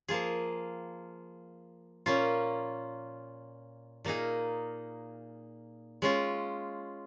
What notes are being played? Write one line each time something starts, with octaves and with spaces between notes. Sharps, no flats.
F3 A#3 F4 G#4
A#2 A#3 C#4 F4
A#2 A#3 D#4 G#4
G#3 C#4 F4